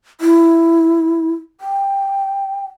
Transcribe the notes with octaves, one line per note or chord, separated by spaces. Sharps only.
E4
G5